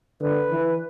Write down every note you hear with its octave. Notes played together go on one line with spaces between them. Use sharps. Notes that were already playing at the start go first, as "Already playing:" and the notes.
D3 B4
E3